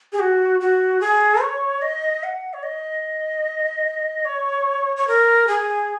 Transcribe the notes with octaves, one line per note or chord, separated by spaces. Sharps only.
G#4
F#4
F#4
G#4
C#5
D#5
F#5
C#5
D#5
C#5
C#5
A#4
G#4